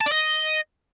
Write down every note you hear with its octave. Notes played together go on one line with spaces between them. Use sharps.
A5
D5
D#5